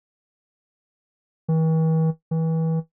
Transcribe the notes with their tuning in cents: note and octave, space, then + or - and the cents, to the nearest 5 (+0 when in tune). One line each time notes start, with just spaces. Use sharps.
E3 -45
E3 -30